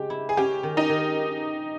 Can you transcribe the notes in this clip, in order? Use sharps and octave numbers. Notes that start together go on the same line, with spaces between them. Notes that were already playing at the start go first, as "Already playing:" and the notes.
Already playing: C#3 G#3 G4
E4
G#4
C#4 G4
D#3
D#4
D#3